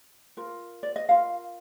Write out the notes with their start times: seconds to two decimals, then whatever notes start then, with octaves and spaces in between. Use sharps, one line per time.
0.37 F4 A#4
0.83 D5
0.96 D#5
1.08 F4 A#4 F5